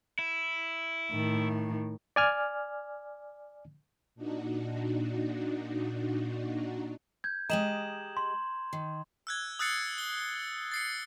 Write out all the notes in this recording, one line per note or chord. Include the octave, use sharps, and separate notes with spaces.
E4
A2 D#3
D5 G#5 F6
A#2 D4 D#4 F#4
G6 G#6
G#3 G4 D#5 A#5 E7 F#7
C6
D#3
E6 F#6 G#6
D#6 E6 F#6 A6 C7 C#7
G7
A6 C7 C#7